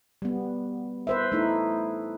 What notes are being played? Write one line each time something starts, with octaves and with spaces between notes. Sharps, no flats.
G3 B3
B4 C5 E5
A3 D#4 E4